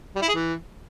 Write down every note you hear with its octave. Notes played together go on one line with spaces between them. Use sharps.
G3
E4
G#4
E3